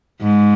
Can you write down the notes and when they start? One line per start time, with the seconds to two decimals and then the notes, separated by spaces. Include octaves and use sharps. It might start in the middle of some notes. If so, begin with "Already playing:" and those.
0.22 G#2